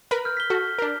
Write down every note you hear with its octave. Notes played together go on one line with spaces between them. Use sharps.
A#4 B4 B5
F6 G6
B6 G7
F#4 A4
D4 A#4